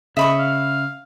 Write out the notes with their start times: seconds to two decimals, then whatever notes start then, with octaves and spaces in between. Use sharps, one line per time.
0.17 C#3 D#5 E5 B5 C#6
0.40 F5